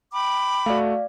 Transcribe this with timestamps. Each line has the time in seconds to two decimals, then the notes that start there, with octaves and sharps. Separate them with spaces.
0.12 G5 B5 D6
0.66 A3 F#4 D5 F5